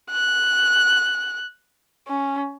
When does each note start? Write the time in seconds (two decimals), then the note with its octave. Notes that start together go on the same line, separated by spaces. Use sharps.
0.11 F#6
2.08 C#4